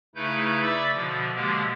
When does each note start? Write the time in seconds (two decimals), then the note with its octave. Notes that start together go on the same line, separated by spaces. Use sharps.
0.15 C#3 A3 D#4 E4 B4 G6
0.62 D5 E5 B5 D6 E6 A6
0.94 B2 D3 F3
1.35 B2 D3 F3 G#3 A#3 G4